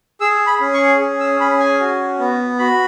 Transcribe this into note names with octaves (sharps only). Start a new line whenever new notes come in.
G#4 E6
B5
C#4
C#6
G#4
E6
C#4 B5
G#5
F#4
B3
F#4 B5